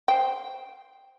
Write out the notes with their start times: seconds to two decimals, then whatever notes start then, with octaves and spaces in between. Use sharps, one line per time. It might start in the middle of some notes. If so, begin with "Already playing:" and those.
0.08 C5 G5